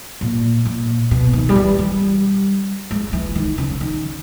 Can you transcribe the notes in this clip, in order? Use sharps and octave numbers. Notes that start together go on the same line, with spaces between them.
A#2
A#2
B2
D#3
G3
E3
G3
G#3
E3
D#3
C#3
D#3